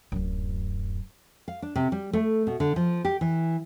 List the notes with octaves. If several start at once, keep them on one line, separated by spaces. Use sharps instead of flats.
D1 F#2
F5
D4
C3
G3
A3
B2
D3
F3
G4
E3